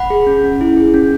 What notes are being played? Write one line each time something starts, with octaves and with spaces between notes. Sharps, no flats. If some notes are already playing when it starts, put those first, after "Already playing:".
Already playing: F#5 B5
G#4
C#4
C#4
E4
G#4
C#4